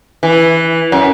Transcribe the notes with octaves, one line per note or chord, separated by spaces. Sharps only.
E3
F#2